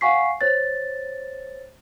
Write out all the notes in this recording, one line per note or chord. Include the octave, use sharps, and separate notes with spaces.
F5 F#5 G#5 C#6 B6 C7
C5 C#5 A6